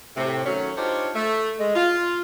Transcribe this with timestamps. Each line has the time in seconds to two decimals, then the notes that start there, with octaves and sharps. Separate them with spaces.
0.16 A2 C3
0.45 D#3 F#3 A3 C#4
0.77 D4 D#4 F4 G4 C5 C#5
1.15 A3
1.58 G#3
1.75 F4